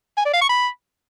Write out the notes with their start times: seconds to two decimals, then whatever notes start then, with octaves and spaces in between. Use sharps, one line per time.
0.17 G#5
0.25 D5
0.33 F5
0.41 C#6
0.49 B5